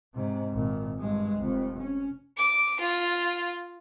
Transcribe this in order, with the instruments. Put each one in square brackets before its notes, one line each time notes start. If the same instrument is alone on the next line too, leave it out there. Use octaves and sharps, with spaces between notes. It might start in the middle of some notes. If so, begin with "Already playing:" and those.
[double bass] G#2 C3
G#1 A#2
G2 G#3
F1 F2
C#4
[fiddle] D6
F4